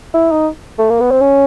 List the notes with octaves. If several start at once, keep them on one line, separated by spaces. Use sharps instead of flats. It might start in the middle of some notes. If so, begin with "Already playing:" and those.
E4
D#4
A3
A#3
B3
C4
C#4